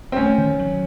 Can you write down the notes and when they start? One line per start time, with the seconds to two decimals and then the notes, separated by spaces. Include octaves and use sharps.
0.12 C4
0.16 A3 C#4
0.38 D#3
0.59 F#3